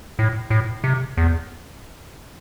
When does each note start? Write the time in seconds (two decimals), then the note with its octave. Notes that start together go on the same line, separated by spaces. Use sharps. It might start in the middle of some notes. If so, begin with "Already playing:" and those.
0.19 A2
0.50 A2
0.84 C3
1.17 E2